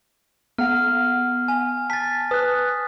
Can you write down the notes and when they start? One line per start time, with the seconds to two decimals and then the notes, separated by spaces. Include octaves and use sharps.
0.58 B3 F#5 F6
1.48 G#5
1.90 A5 A6 B6
2.31 B4 D#6 F#6